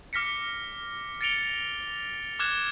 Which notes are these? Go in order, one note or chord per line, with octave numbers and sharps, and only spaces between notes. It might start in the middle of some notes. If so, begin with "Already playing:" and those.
D6 F6 A#6 B6 C#7
A6 A#6 C#7 D7 F7 G7
D6 F6 F#6 G#6 E7